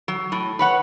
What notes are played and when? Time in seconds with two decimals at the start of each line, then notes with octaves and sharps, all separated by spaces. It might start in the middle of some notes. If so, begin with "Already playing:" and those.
0.08 F#3
0.32 A2
0.59 B4 C#5 F#5